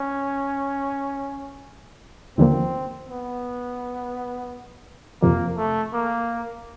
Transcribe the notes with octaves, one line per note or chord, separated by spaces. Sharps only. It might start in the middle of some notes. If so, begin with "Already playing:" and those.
Already playing: C#4
D#2 D3 F3 A#3 C4
B3
F2 C3 F3 A#3
A3
A#3